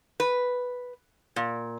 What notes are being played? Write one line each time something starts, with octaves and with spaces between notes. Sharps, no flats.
B4
A#2